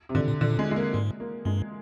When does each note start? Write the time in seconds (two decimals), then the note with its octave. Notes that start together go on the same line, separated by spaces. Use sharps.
0.09 C3
0.15 G#2 D3
0.28 A#2
0.41 A#2 D3
0.59 G#3
0.71 G#3
0.76 A#3
0.94 G#2
1.20 A#3
1.45 G2 G#3